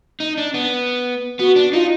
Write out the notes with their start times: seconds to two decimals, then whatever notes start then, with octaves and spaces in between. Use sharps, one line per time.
0.20 D#4
0.38 D4
0.54 B3
1.39 B3 F#4
1.56 D4
1.73 D#4 F4